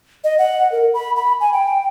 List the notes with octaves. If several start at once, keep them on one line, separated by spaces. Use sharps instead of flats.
D#5
F#5
A#4
B5
B5
G#5
G5